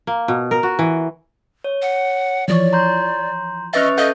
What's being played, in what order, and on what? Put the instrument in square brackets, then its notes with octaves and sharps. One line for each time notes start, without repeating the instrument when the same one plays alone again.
[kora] A#3
B2
A#4
F#4
E3
[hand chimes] C#5
[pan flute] F#5
[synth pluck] E3 F3 C#5 [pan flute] D5
[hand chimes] A#5 C6 G6
[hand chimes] C#4 B4 A6 [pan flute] D#5 [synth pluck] E5 C#6 F6
[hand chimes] A4 G6 [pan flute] D#5 [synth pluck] F5 D#6